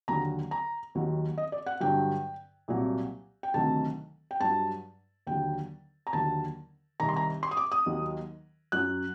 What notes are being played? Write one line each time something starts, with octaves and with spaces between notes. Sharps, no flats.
D#2 D3 F#3 A#5
A#5
D#2 D#3 F#3
D#5
D5
F#5
G2 D3 F#3 G5
C2 A#2 F#3
G5
D2 C3 D#3 F#3 A5
G5
G2 F#3 A5
D#2 D3 F#3 G5
A#5
D#2 D3 F#3 A5
C2 C3 D#3 A#5
C6
A#5
C6
D#6
D6
D#6
D#2 D#3 F#3
F#2 F#3 F#6